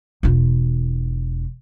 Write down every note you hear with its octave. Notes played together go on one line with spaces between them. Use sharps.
E1 F4